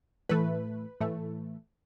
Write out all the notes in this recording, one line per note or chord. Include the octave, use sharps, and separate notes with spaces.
A2 E3 A3 B4
A2 E3 A3